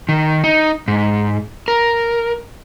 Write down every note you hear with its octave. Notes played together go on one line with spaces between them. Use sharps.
D#3
D#4
G#2
A#4